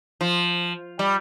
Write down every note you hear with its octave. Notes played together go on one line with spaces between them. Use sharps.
F3
G3